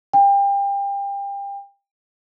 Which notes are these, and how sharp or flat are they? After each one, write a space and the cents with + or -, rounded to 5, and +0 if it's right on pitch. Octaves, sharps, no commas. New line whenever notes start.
G5 +30